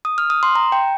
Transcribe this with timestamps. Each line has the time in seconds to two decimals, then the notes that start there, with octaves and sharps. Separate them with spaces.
0.05 D#6
0.18 F6
0.30 D#6
0.43 C6
0.55 A#5
0.72 G5